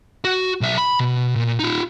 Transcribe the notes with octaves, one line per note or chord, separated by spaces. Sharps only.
F#4
B1 E5
B5
B2
A#2
D#4 F4